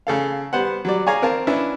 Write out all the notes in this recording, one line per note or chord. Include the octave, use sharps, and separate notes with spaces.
C#3 A4 F5
G3 B3 C5 F#5
F#3 G3 D5
G#4 C#5 D5 F5 G#5 A#5
C4 A#4 F5 A5
C#4 D4 E4 B4